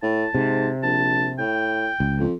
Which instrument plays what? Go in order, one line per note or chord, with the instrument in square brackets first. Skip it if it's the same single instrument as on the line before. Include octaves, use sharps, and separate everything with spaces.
[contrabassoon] A2 [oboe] A5
[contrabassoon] G#2 [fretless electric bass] C3
[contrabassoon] A#1 [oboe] A5
[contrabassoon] A2 [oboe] G5
[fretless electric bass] C#2
[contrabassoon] F2